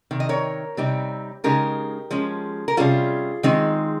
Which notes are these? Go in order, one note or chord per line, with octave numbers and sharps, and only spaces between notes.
C3 D#3
D#5
A#4 C#5
C3 G3 C4 D#4
C#3 G#3 D#4 G4 A#4
F3 G#3 C#4
A#4
C3 G3 C#4 F4 G#4
D#3 G#3 C4 D#4